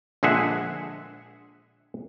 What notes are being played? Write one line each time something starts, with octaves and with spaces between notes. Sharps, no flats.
A#1 D3 G#3 G#4 E5 F#5